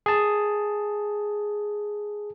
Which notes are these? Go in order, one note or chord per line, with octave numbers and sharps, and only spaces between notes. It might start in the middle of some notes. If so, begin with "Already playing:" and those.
G#4 A5